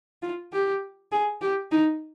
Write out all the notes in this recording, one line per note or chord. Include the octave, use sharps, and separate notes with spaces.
F4
G4
G#4
G4
D#4